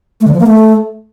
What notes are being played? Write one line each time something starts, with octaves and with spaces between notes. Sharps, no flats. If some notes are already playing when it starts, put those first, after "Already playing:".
A3
D3
F3
A#3
A3